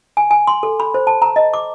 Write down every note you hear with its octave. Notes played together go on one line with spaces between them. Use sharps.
G#5
G#5
C6
A4
B5
C5
A5
A#5
D#5
D6